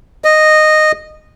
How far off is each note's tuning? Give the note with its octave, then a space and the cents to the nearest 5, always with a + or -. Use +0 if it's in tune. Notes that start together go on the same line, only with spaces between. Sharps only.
D#5 -10